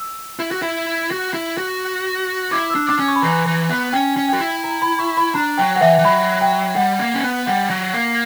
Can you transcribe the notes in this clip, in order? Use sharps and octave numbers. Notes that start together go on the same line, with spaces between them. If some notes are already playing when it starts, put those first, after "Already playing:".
Already playing: E6
E4
F#4
E4
F#4
E4
F#4
E4 D6
E6
D4
D4 D6
C#4
C#6
B5
E3 A#5
E3
B3
C#4 G5
C#4
F#4 G5
E4
A#5
B5
C#6
B5
D4 A#5
F#3 G5
F#5
E3 E5
E3
F#3 B5
G5
G3 F#5
A#3
C#4
B3
G3 F#5
F#3
A#3